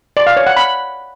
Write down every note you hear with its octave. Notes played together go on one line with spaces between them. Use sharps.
D5
F5
C#5
F#5
B5